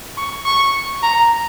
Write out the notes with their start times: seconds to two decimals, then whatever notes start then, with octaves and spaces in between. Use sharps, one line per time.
0.17 C#6
0.46 C#6
1.03 A#5